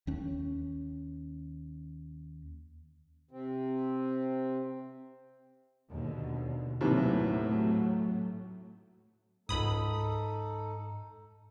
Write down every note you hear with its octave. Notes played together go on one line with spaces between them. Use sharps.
D#2 C#4
C3 C4
D#2 B2 D3
D#2 A2 C3 E3 F#3 A3
C#2 G#2 D#4 A4 B5 D#6